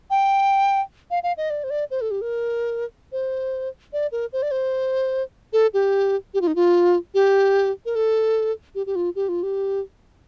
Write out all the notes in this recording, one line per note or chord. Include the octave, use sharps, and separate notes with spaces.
G5
F5
F5
D#5
D5
C5
D5
C5
A4
G4
A#4
C5
D5
A#4
C5
D5
C5
A4
G4
G4
F4
D#4
F4
G4
A#4
A4
G4
G4
F4
G4
F4
G4